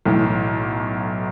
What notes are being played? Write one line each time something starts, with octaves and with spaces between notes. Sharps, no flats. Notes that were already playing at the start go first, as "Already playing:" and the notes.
B1 A2 E3